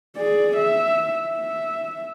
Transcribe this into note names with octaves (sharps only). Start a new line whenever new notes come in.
G#4 D5
E5
E5